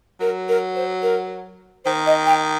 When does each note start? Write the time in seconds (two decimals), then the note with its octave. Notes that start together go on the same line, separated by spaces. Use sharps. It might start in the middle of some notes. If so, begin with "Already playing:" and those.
0.20 F#3 A#4
0.49 A#4
0.76 C5
1.03 A#4
1.85 D#3 C5
2.07 D#5
2.26 G5